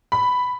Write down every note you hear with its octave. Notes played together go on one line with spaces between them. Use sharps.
B5